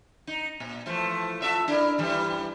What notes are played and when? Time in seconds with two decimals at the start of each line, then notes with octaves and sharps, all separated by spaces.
0.27 D#4
0.60 A#2
0.86 E3 F3 A3
1.42 F4 A4 E5
1.68 D4 E4 A#4
1.98 G2 E3 G3